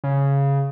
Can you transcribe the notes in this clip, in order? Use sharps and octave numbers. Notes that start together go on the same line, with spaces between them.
C#3